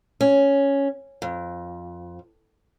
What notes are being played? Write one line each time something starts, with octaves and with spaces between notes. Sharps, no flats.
C#4
F2